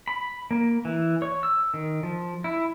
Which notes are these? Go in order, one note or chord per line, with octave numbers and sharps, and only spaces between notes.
B5
A#3
E3
C#5
E6
D#3
F3
E4